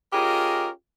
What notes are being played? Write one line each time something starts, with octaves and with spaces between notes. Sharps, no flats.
C#4 F4 G4 G#4 A#4 D#5